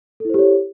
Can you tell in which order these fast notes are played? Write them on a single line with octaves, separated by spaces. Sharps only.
A4 E4 C5 G4 C#5